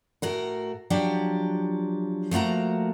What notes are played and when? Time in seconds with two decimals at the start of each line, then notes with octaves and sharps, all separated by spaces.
0.22 A2 F#4 A#4
0.90 F3 F#3 D4 G4
2.31 F3 A3 A#3 F#4 A#5